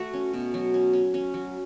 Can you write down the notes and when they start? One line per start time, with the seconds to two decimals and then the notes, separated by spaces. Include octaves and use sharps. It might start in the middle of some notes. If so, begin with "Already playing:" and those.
Already playing: A3 F#4
0.14 C#4
0.33 B2
0.54 F#3
0.74 C#4
0.93 C#4
1.14 C#4
1.34 F#3